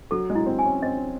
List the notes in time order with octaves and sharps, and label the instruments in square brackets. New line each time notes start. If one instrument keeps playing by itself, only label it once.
[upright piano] F#3 [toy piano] A4
[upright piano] G#3
[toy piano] E4
[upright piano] C4
[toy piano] G#5
[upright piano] C#4
[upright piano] C4 [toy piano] D#5